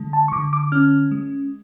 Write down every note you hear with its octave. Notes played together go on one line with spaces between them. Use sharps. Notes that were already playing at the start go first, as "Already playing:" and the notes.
Already playing: D3 G#3
A5
C#6
D3 D6
D6
C#4 F6
G#3